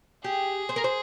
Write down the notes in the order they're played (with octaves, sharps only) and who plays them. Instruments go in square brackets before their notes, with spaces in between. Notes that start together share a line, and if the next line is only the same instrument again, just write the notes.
[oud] G4 [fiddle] G#4
[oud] C5
A#4
C5